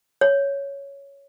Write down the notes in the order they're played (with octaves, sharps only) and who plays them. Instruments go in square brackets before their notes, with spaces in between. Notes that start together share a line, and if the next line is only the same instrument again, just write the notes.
[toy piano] C#5